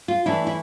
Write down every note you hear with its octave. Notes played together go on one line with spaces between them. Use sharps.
F4
E3 A3 D4 E4
E4